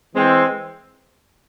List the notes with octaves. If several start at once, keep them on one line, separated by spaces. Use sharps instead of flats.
E3 G#3 C4